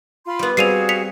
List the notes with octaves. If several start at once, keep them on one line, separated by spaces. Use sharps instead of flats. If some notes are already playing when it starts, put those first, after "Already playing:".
F4 B5 C6
G3 B3
G3 C4 F#4 G#4 F5 C7 D#7 F7
B6 C#7 F7